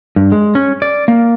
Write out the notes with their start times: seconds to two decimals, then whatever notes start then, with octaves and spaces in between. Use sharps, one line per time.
0.16 G2
0.32 G#3
0.55 C#4
0.82 D5
1.08 A#3